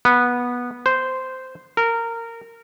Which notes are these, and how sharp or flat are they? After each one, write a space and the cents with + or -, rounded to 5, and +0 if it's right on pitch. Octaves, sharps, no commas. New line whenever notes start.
B3 -15
C5 -10
A#4 -20